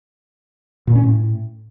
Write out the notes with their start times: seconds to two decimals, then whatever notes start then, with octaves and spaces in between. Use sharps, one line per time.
0.87 A#2
0.95 C#4
1.03 A2